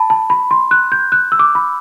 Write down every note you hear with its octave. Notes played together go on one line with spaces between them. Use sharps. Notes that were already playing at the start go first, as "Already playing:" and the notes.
Already playing: A5 B5
A5
B5
C6
F#6
G6
F#6
E6
D6
B5